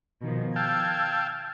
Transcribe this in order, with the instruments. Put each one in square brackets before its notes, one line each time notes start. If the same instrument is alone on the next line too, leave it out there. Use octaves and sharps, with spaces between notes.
[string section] B2 D#3 F3
[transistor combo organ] F5 G5 A5 [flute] E6 [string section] G#6